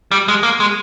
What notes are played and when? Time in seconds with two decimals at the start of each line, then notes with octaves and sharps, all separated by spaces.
0.11 G3
0.28 G#3
0.43 A#3
0.60 G#3